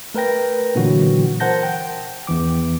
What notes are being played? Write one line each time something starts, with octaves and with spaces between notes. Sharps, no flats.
A3 A#4 B4 G5 A#6
A#2 D3 E3 F#3 F#4
A#4 C5 F#5 A5 G6 A#6
G5
E2 E3 D6